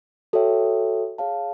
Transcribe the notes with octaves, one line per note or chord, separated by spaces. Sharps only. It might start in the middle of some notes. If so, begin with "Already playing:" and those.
F#4 A4 C#5 E5 G5
G#4 C#5 F5 A5